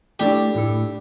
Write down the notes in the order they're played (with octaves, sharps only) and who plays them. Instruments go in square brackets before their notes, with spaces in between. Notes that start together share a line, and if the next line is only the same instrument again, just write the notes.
[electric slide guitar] A3 E4 A4 D5 [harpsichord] D4 G4
[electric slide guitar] A2 A3 E4 A4